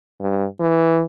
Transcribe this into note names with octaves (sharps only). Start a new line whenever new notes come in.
G2
E3